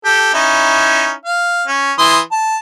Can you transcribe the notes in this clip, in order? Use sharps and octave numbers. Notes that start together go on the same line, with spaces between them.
G4 A4
C#4 D#4 E4
F5
C#4
E3 C6 D#6
A5